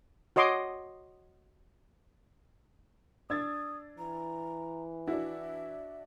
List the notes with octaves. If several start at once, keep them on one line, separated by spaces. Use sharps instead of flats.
F#4 C#5 D#5 C6 D6
D4 D#6 E6 G#6 A6
E3 A#5
D4 E4 F#4 E5